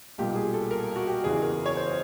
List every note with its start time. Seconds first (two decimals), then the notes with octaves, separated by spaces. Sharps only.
0.18 B1 A#2 G3 A#3 G4
0.35 G#4
0.54 A4
0.71 A#4
0.96 F#4
1.07 G4
1.24 F#1 E2 C#3 E3 G#4
1.42 A#4
1.66 C#5
1.77 C5